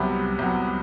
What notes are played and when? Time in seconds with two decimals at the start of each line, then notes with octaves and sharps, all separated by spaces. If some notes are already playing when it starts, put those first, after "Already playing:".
Already playing: C2 C3 F#3 B3
0.39 C2 C3 F#3 B3